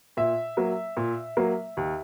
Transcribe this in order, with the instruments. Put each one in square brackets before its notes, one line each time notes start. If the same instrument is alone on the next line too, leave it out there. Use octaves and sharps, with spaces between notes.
[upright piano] A#2 E5
F#3 A#3
A#2
F#3 A#3
D#2